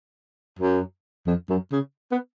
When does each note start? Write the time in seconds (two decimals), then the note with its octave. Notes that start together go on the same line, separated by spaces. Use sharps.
0.59 F#2
1.27 F2
1.50 F#2
1.72 C#3
2.12 B3